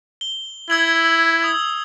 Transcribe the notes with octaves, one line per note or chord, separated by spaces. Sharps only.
G7
E4 E6 G#6 F#7
D#6 G#6